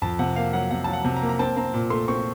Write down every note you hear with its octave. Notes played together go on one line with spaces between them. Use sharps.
F2 A5
C3 F#5
A#3 F5
F#3 F#5
C3 F#5
F#3 A5
F#5
C3
A#5
A#3
A#5
C4 A5
C4 A#5
A#2
A3 C6
C4 C#6